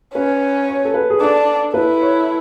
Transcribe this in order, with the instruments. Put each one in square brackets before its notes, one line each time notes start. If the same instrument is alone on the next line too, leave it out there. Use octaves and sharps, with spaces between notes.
[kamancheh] C#4 [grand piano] B4
[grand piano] C#5
A4
B4
G#4
[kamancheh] D4 [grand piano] A4
[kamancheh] E4 [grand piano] B4
[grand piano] C#5